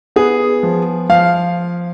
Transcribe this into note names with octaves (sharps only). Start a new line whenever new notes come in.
B3 G#4
F3
F3 F5